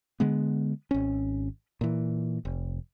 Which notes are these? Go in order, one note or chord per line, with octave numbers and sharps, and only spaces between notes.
D3 G#3 B3
G#1 C#4
A#2 E3
F1